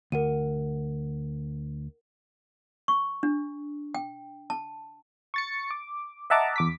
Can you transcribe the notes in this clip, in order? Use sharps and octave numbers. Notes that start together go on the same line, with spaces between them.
D2 A#4 F#5 D#7
C#6
D4
G5
A5
C#6 A6 C#7
D6
D#5 E5 F#5 A5 A#5 D6
E2 D6 B6